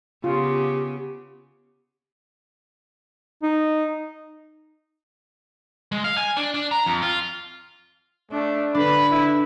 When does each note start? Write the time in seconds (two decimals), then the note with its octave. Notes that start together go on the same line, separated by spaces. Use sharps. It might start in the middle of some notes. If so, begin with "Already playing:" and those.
0.24 C#3 B3 F4 G4
3.43 D#4
5.92 G#3
6.04 F5
6.17 G#5
6.37 D4
6.54 D4
6.71 A#5
6.86 F2
7.02 F4
8.32 A3 D4
8.74 D3 D4 B4 B5
9.10 E4